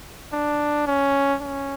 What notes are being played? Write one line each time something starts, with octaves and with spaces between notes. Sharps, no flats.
D4
C#4
C#4